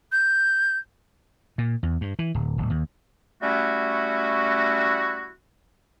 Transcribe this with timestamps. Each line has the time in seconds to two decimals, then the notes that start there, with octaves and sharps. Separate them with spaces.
0.12 G6
1.58 A#2
1.83 E2
2.01 G2
2.19 E3
2.35 D1
2.58 D1
2.70 D#2
3.42 G3 A3 C#4 E4 F#4